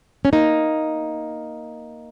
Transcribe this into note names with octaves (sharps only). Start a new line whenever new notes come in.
C#4
A#3 D#4